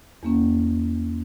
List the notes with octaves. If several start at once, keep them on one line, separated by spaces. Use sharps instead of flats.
E2 A#3 C#4